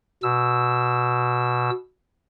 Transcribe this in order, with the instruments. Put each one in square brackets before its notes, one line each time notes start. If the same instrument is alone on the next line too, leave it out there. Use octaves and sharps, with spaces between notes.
[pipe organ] B2 E6